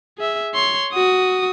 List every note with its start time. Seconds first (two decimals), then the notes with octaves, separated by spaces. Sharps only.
0.18 G#4 E5
0.54 C#5 C6
0.93 F#4 D#6